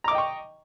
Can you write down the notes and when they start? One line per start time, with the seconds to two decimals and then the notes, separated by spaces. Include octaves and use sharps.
0.04 A#5
0.08 D6
0.11 D#5
0.15 G5
0.18 C#6